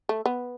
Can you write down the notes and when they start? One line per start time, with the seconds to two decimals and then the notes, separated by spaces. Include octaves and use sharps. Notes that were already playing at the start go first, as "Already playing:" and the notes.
0.09 A3
0.26 B3